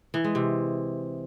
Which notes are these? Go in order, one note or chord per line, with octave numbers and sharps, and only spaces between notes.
E3
G#3
C3